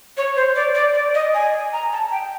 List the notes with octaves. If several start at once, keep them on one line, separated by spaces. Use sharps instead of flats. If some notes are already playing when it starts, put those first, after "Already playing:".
C#5
C5
D5
D5
D5
D#5
G#5
A#5
A5
G5